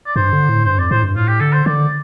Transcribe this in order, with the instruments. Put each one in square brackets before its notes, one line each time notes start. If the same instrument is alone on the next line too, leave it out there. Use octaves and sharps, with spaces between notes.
[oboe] D5
[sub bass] G2 [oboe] C5
[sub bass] D3
A2
[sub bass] G2 [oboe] C5
[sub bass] F2 [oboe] D5
[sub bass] A2 [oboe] C5
[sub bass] G2
[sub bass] A2 [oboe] F4
[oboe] G4
[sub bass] D3 [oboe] A4
[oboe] C5
[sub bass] D3 [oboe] D5